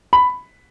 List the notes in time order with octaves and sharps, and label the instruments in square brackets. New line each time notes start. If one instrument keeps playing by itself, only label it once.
[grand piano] B5